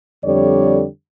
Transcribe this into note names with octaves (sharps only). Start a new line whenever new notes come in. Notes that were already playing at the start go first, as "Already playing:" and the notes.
F2 D3 G3 C#5 D5